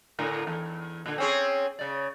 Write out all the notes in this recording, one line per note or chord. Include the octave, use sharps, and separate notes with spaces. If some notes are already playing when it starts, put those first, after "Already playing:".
A2 D3 A#4
E2
A#2 D3
C4 C#4 G#4
C#3 D5